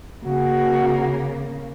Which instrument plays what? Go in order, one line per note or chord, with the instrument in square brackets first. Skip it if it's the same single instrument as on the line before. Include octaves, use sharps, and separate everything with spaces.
[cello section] C#3 A#3 [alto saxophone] F#4